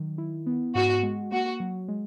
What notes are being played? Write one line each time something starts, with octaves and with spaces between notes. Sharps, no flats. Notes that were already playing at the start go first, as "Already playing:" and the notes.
Already playing: D#3 F#3
E4
B3
G#2 F#4
G#3
A#3 F#4
F#3
G#3